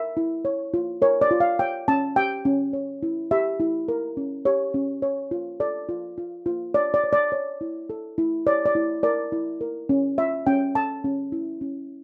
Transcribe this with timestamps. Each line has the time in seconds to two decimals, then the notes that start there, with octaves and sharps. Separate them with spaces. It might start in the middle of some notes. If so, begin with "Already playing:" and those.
Already playing: A#4 E5
0.17 E4
0.45 C#5
0.74 F4
1.02 A#4 C#5
1.21 D5
1.31 F4
1.40 F5
1.59 C#5 G5
1.88 C#4 A5
2.16 G4 G5
2.45 C#4
2.73 C#5
3.03 E4
3.31 G4 E5
3.60 E4
3.88 A#4
4.17 C#4
4.45 G4 C#5
4.74 C#4
5.02 C#5
5.31 F4
5.60 A4 D5
5.89 F4
6.18 F4
6.46 F4
6.74 C#5 D5
6.94 D5
7.04 C#5
7.13 D5
7.32 C#5
7.61 E4
7.90 A4
8.18 E4
8.47 C#5 D5
8.66 D5
8.75 E4
9.03 A#4 D5
9.32 E4
9.61 A#4
9.89 C#4
10.18 F4 E5
10.47 C#4 G5
10.75 A4 A5
11.04 C#4
11.32 E4
11.61 C#4